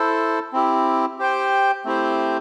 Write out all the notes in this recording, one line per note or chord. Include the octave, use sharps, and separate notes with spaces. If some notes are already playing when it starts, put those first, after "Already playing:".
Already playing: E4 A4 C5
C4 E4 G4
G4 C5 G5
A3 C4 E4 G4 C5